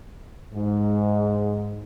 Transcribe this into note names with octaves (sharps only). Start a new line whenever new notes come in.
G#2